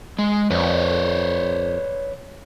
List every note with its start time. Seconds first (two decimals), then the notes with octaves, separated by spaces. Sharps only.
0.19 G#3
0.51 F2 B4 C#5 D5